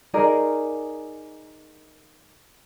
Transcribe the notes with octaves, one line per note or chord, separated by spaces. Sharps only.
D#4 G#4 A#4 D5